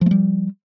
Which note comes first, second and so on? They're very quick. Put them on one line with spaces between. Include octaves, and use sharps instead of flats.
F3 A3 G3